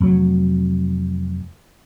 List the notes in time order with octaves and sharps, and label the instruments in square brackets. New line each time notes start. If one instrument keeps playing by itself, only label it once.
[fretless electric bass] F1 F#3